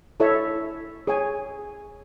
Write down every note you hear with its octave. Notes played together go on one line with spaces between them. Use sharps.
E4 A4 C#5 E5
G#4 C#5 G#5